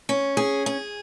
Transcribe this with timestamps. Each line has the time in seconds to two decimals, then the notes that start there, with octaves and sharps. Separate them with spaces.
0.09 C#4
0.37 G#4
0.66 G#4